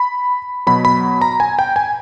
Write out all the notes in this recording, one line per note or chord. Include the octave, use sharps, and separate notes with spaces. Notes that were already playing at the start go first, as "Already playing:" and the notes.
Already playing: B5
B2 F#3 B5
B5
A#5
G#5
G5
G#5